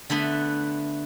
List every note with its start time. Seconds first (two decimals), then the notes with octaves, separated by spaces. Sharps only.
0.10 D3 A3 B3 B4